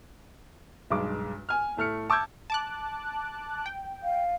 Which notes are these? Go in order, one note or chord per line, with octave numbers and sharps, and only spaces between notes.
B1 G2 G#3 D6
G#5 F6
A2 A3 F6 C#7
A5 D6 E6 G6 G#6
A5 D6 F#6
G5
F5